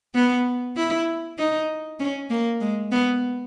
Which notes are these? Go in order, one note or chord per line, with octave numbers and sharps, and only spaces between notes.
B3
E4
D#4
C#4
A#3
G#3
B3